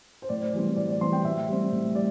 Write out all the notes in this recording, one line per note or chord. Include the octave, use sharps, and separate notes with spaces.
C5
A2 D5
E3 G3 C4
A2 D5
D5
E3 G3 C4 C6
G5
A2 E5
G3 C4
A2
G3 D5